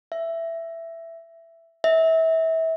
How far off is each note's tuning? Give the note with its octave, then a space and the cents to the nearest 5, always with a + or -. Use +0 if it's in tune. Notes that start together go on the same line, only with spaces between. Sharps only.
E5 +10
E5 -30